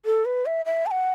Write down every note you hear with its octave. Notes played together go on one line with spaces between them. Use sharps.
A4
B4
E5
E5
A5
F#5